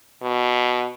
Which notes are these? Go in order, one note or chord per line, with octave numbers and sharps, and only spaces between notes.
B2